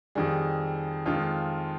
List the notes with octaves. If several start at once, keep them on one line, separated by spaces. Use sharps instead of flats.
F2 D#3 G3 G#4
F2 D#3 G#3 F4